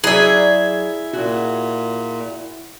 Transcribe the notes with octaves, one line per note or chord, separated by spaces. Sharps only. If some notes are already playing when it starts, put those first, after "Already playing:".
F#3 E4 G#4 D5 E5
A#2 F#4